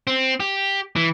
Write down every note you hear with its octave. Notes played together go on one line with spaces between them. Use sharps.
C4
G4
E3